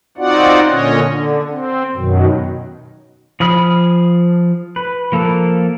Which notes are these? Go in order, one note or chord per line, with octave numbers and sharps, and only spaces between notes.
C4 D#4 F4 F#4 D5 F#5
A#2 D3 C#4 C#5 D#5
D3
C4
F#2 B2 D#3 F#3
F3 G#4 B5 F6
B4
F3 A#3 A4